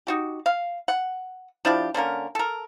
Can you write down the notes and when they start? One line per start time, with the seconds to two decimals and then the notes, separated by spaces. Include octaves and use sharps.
0.07 D#4 F#4 G4
0.46 F5
0.88 F#5
1.65 F3 D4 E4 G4
1.94 D3 A#3 C#4 A#4
2.35 A4 A#4